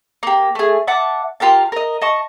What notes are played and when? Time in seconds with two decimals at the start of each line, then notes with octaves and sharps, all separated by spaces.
0.23 A#3 G4
0.55 A3 G#4
0.87 E5 F#5 A5 D6
1.40 F4 G4 A#4 A5
1.72 A#4 D#5
2.02 D#5 A5 C#6